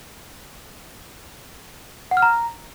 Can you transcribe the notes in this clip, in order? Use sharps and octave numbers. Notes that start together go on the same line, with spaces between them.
F#5
F6
A#5